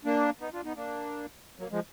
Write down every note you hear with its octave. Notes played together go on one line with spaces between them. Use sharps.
A#3 D4
B3 D#4
D4 F4
B3 D#4
A#3 D4
F#3 A#3
F3 G#3